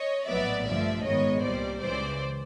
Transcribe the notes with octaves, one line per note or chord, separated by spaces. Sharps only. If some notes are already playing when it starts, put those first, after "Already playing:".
Already playing: C#5 D#5
A#1 A2 F#3 B3 D5 E5
G2 D3 F3 A3 D5 E5
G#2 D#3 G#3 B3 C#5 D#5
C2 A#2 G3 C5 D5
C#2 C#3 E3 C5 D5